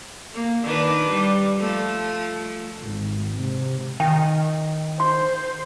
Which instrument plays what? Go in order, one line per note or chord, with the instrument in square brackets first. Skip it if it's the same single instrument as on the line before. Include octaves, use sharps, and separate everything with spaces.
[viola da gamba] A#3
D#3 D4 B4
G3
F3 A3
[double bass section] G#1
C3
[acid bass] D#3 [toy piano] G5
[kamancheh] C5 [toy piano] C6